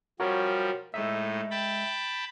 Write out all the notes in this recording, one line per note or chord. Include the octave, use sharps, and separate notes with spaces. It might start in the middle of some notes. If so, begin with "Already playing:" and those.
F3 G3 F#4 A#4 C#5
A2 G#3 D#4 E5
G5 A5 B5